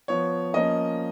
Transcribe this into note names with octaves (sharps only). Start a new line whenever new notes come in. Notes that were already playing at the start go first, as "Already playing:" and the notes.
F3 B3 C#5
F3 A#3 C#4 D#5